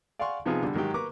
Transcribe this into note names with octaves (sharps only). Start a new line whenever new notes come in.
D5 F5 F#5 G#5 C6 C#6
C3 F3 B3 D#4 F4 G#4
D3 G3
G#2 D#3 F#3 G4
A#3 B4 A#5 C#6 D6